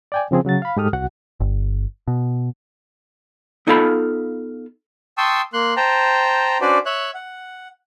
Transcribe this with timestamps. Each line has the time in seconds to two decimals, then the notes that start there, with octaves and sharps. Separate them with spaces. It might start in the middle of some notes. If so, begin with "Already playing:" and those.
0.12 D5 G5 G#5
0.31 C#3 F3 C4 G#4
0.45 C#3 F#3 F#4 A6
0.62 F5 B5
0.77 G#2 G#3 G4 A4 D#6 F6
0.93 C2 F#4 F#5
1.40 G1
2.08 B2
3.67 B3 D#4 F4 A4 F5 B5
5.18 G5 A5 C6 C#6 D#6 E6
5.53 A#3 C6 F#6
5.77 C5 G5 A5 A#5
6.61 C#4 D4 F#4 B4 C5 D5
6.86 C#5 E5 F#6
7.14 F#5